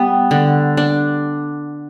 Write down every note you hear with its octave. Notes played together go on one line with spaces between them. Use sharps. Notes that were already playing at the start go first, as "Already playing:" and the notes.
Already playing: G3 B3
D3
D4